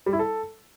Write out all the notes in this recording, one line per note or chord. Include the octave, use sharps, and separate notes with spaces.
G3
E4
A4